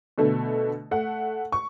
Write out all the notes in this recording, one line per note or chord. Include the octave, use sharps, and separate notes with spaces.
B2 D3 A3
A3 F#5
C#6